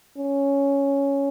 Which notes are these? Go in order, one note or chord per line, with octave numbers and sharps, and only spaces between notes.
C#4